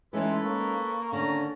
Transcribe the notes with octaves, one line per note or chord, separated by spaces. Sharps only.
E3 G#3 C#4 D#4 A4 B4 C6
A#3 C#6
D3 D#3 C#4 D4 A#5